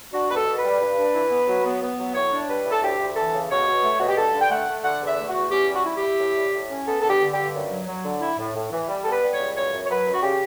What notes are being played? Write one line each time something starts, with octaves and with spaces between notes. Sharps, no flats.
D4 F#4
B2 B4
A4
B2
B4
G3
G2
D4
E3
B3
F#3
B3
B3
F#3
A2 C#5
D4
G3 B4
A2
A4
D2 G4
D2
E3 A4
C#3
B2 C#5
B2
A3
B2 F#4
G4
G2 A4
D3
G5
A3 F#5
A3
D3 F#5
E2
E5
A3
F#4
E2
C#4 G4
G3
F#4
E4
G4
E4
A2
G3
A2
C#4
B3 A4
D3 A4
G4
D3
G4
G2
F#2
F#3
F#3
D3
E4
A2
A2
E3
G3
B3 A4
B4
G3
C#5
C#2
F#2 C#5
F#2
C#5
F#3 B4
F#2
F#4
C#3 G4